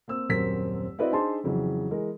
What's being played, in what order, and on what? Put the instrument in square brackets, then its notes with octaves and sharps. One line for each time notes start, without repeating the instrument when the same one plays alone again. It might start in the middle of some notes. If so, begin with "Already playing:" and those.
[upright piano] A#3 C4 E6
D#1 F#2 C4 A#4 B6
C4 E4 F#4 B4 D5 D#5
D4 D#4 G#4 C5 A5 C6
F2 C#3 E3 F#3
E3 G#3 A#4